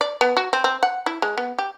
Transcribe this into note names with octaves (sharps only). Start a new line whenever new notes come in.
D5
B3
F#4
C4
C4
F#5
E4
G#3
B3
G4